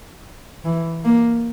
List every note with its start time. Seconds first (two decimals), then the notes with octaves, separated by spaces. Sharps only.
0.65 E3
1.04 A#3